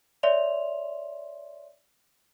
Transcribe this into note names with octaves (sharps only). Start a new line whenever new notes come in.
C#5 D5 E5 C6 F7